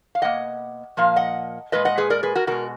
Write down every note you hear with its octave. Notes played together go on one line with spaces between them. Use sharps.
F5
B2 A#3 D#5 F#5
A#2 F3 A#3 F5
D#5 F#5
A#2 G#3 B4 D#5
D#5 F#5
G#4 B4
A#4 D5
G#4 B4
F#4 A#4
B2 G#3 F#4 A#4